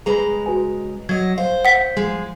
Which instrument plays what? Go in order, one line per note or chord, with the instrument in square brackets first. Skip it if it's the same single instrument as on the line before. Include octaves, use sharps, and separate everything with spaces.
[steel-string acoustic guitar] C#3 G#3 A#5 [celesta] G#4 B4 B5
[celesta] F#4 B4 G#5
[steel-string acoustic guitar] F#3 D#5 [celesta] G#6
[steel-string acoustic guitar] C5 [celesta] F5
[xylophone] F#5 B6
[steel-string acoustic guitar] F3 G#3